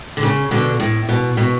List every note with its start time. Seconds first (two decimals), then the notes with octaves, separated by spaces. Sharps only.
0.17 D3
0.23 C#3
0.51 B2 D3
0.80 A2
1.09 B2
1.37 B2